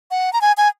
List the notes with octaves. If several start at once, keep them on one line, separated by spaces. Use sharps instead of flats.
F#5
A#5
G#5
G#5